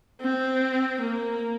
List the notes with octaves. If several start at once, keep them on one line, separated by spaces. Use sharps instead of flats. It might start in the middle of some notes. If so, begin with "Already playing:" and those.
C4
A#3